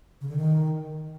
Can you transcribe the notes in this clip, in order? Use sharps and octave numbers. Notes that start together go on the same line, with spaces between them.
C#3
D3
D#3